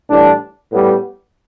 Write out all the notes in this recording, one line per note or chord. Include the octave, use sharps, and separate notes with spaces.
A2 E3 G3 D4
A2 G3 B3